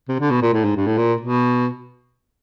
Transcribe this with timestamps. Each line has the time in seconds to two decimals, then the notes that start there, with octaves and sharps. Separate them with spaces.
0.08 C3
0.20 D3
0.30 B2
0.42 A#2
0.53 A2
0.64 G#2
0.76 G2
0.87 A2
0.98 A#2
1.21 B2